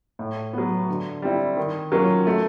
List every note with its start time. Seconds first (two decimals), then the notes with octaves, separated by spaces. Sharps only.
0.19 A2
0.53 F#3 B3
0.89 D3
1.22 G3 C4 E4
1.57 D#3
1.92 F#3 A#3 C#4 F4
2.27 A3